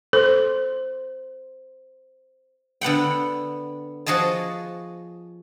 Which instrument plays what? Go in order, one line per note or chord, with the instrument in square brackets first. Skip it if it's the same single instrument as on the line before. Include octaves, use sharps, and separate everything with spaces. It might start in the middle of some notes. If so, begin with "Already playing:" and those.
[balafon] A4 [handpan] C5
[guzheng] D3 B3 F#5 G5
F3 F#4 G#4 D#5 A5